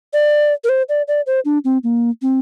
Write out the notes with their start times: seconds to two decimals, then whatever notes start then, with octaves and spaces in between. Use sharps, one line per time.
0.13 D5
0.64 A#4
0.69 C5
0.89 D5
1.08 D5
1.27 C5
1.45 D4
1.65 C4
1.84 A#3
2.22 C4